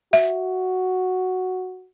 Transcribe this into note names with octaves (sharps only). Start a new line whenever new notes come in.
F#4 E5